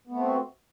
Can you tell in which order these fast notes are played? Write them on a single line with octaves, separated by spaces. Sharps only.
B3 A3 C4 F#4